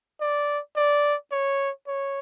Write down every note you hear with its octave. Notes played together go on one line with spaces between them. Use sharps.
D5
D5
C#5
C#5